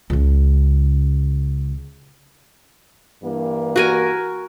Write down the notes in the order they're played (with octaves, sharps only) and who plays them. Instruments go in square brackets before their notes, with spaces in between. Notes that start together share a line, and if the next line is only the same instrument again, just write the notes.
[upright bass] C#2 C#3
[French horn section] G2 E3 A#3
[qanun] F#4 A#4 G#5